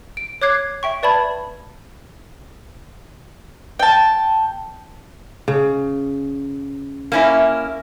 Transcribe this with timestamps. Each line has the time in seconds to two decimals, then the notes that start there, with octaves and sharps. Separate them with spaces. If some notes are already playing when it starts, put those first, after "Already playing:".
0.17 D7
0.42 C#5 D6 F#6 G#6 C7
0.83 E5 G5 C#6
1.03 B4 D5 A5 B5 G#6
3.79 G5 A5
5.48 C#3
7.12 A#3 C#4 E4